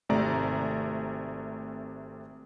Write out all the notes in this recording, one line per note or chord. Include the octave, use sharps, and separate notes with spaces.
G#1 C3 A3 D5 A#5